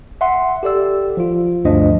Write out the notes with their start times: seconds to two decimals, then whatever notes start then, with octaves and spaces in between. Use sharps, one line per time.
0.21 E5 F#5 C6
0.63 G4 A4 D5 E6
1.17 F3 F4
1.65 D2 G2 F3 D4 D#5